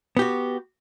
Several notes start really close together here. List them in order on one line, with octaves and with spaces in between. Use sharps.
B3 G4 F#4